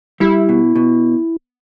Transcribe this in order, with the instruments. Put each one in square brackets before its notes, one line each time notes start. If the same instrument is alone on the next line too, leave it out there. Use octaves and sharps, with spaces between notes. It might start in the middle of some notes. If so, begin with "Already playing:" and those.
[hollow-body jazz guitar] G3 [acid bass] E4
[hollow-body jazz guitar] B2
B2